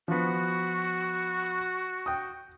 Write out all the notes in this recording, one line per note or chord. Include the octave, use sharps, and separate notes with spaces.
F3 B3 F#4
G5 D#6